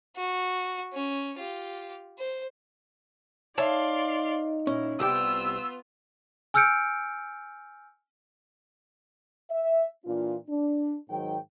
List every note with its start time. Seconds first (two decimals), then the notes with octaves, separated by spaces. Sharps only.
0.16 F#4
0.93 C#4
1.37 F4 G4
2.18 C5
3.58 D#4 C#5 D5 E5 F5 A5 C6
4.67 A#2 C#4 E4
5.00 C2 B3 F4 G4 G5 E6
6.54 G#5 E6 F6 G6 C#7 D7
9.50 E5
10.05 A#2 E3 D4 F4
10.48 D4
11.09 G#2 D#3 F#3 G5